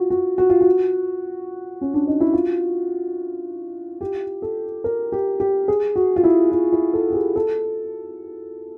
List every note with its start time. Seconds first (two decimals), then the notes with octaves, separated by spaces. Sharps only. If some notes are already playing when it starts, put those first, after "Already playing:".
Already playing: F4 F#4
0.10 F#4
0.38 F#4
0.50 F4
0.61 F#4
1.81 C#4
1.94 D4
2.07 D#4
2.20 E4
2.33 F4
4.01 G4
4.42 A4
4.84 A#4
5.12 G4
5.40 G4
5.68 G#4
5.96 F#4
6.16 F4
6.24 E4
6.52 E4
6.72 E4
6.93 A4
7.10 G4
7.14 G#4
7.36 A4